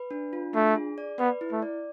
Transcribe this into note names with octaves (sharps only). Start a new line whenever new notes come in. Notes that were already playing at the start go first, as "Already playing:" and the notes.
Already playing: B4
D4
F4
A3 D4
G#4
D5
B3 B4
E4
A3
D5